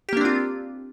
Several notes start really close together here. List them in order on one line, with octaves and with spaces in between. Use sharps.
G4 A#3 D4 C4 F4